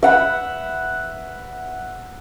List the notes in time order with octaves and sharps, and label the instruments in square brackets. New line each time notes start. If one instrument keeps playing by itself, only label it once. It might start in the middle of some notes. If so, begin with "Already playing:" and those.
[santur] E5 F#5 B5